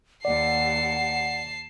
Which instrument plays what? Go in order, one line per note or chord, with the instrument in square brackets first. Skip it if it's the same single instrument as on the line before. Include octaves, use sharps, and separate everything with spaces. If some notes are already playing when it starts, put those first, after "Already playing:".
[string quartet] D#2 [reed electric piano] D5 [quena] F#5 [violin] A5 C7